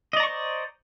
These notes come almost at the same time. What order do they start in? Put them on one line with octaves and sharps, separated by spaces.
D#5 D5 A#5 C#6 C5